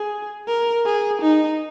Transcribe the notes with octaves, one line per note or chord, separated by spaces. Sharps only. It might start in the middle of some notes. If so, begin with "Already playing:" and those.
Already playing: G#4
A#4
G#4
D#4